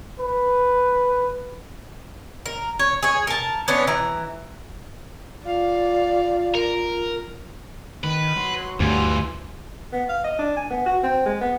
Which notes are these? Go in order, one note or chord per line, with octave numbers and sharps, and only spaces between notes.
B4
A#4
C#5
G#4 C#5
A#4 A5
B3 C#4 D4
E3 A#5
F4 D5 F5
A#4
D#3 B4
F#3 C6
D2 G2 E3 F4 G#5 C6
B3
F5
D#5
D4
G#5
B3
F#4
C4
G#3
B3